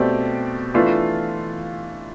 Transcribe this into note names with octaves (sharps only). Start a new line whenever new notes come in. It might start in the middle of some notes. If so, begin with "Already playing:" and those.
Already playing: B2 A3 C4 G4 D5
E3 A3 D4 F4